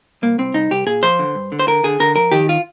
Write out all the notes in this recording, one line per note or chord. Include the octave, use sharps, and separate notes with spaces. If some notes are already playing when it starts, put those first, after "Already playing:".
C2 A#3
C2 C4
C2 D#4
C2 G4
A#2 G#4
F3 C5
D3
G2
D3
C5
D3 A#4
D3 G#4
D3 A#4
F2 A#4
D#3 G4
F4